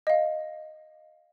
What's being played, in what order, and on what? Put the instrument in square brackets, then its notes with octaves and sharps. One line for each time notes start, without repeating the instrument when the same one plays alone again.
[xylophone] D#5 F5